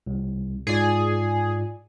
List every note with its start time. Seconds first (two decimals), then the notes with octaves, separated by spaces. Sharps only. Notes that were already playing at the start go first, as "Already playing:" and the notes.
0.07 C2
0.67 G#2 F4 G#4 D5